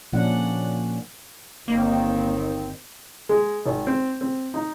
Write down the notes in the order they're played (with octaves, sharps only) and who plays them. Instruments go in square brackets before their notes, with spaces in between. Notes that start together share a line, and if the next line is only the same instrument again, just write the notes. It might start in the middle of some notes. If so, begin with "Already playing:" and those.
[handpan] A#2 F3 C#4 D4 F#5
[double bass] G1 C4 [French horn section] D#2 D#3 [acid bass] A#3
[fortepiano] G#3
G#1
C4
C4
D#4